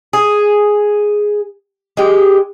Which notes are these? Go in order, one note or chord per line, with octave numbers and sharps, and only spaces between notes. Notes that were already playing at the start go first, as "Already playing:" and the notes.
G#4
G#3 G4